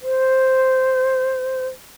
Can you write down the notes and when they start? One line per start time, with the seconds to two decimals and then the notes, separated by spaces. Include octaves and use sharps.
0.02 C5